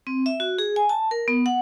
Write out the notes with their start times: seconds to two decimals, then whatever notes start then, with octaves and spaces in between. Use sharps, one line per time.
0.07 C4
0.26 E5
0.40 F#4
0.59 G#4
0.76 G#5
0.89 A5
1.11 A#4
1.28 B3
1.46 F#5